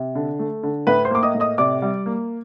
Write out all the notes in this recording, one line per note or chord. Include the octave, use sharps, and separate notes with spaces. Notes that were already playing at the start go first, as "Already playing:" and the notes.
Already playing: C3
D3
A3
D3
A2 B4 B5
C5 C6
A#3 D6
D#5 D#6
A2
D#5 D#6
C3 D5 D6
G3
A#3